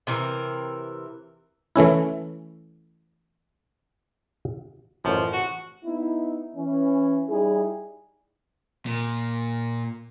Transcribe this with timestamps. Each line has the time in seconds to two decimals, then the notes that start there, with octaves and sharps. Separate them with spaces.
0.07 C3 E3 A#4
1.76 E3 A3 C#4 E4
5.05 A1 F#2 F3
5.33 F#4
5.85 B3 D#4 E4
6.56 E3 C#4
7.29 G3 D#4 E4 G#4
8.86 A#2